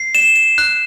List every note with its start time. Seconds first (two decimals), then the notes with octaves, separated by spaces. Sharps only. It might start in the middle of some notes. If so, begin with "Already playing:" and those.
Already playing: C7
0.15 E7
0.36 E7
0.58 F#6